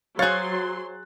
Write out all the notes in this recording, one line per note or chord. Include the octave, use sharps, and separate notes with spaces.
F#3 G#4 C5 C#5 F5 C6 F#6 A6